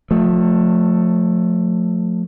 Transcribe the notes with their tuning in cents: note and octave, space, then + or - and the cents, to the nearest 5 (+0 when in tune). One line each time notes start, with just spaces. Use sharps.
F3 +35 A3 +10